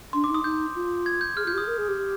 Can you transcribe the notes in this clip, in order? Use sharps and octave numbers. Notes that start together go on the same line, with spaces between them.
D4 C6
D6
D#4
D#6
D#4 G6
F4
G#6
G6
G#4 F6
F4 G6
G4
G#4 D#6
A#4
G#4
G4